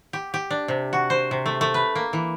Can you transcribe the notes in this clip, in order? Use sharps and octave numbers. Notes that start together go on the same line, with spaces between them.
G4
G4
D4
C3
F#4
C5
C3
A3
A3
B4
A#3
E3